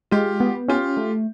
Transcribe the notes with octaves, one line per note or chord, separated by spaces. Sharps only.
G#3 F4 G4
B3
C#4 F4 G4
A3